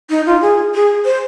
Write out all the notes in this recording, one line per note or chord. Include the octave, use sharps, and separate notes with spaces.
D#4
F4
G#4
G#4
C5